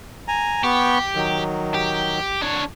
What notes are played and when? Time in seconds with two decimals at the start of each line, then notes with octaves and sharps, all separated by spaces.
0.28 G#5 A#5
0.64 B3 G4 C#6
1.15 D#3 F#3
1.74 G4
2.42 D4 C#5